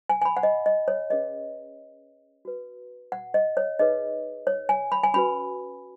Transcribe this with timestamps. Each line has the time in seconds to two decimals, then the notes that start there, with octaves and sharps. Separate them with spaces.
0.09 G#5
0.22 G#5
0.25 B5
0.37 F#5
0.43 D#5
0.66 D#5
0.88 C#5
1.10 C#4 G#4 B4 D#5
2.45 F#4 B4
3.12 F#5
3.34 D#5
3.57 C#5
3.79 D#4 G#4 B4 D#5
4.47 C#5
4.69 G#5
4.92 B5
5.03 G#5
5.14 C#4 F#4 B4 B5